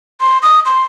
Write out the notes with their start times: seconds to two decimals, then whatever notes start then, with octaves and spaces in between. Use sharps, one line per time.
0.21 C6
0.43 D#6
0.66 C6